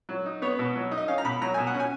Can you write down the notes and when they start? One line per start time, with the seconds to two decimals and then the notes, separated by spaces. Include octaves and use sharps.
0.09 F#3
0.26 D#4
0.42 B3 C#5
0.59 B2
0.76 F#3
0.91 D#4
0.98 D#5
1.08 C#4 F5
1.18 A#5
1.25 B2 B5
1.41 F#3 A#5
1.54 B2 G#5
1.67 F#5
1.74 C#4
1.80 G#5